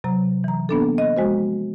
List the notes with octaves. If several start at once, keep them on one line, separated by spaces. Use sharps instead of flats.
C3 F#3 A#5
E3 A#5
A#3 B3 D4 A4
D#5
F3 G#3 F#4 C5